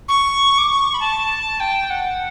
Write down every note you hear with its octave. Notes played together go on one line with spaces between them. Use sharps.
C#6
D6
C#6
B5
A5
G5
F#5